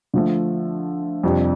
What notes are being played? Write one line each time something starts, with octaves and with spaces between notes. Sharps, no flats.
D3 F3 A3
F2 C3 G3 D4